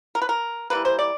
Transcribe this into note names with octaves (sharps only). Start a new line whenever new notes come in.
A#4
B4
A#4
E3 G3 A#3 B4
C5
D5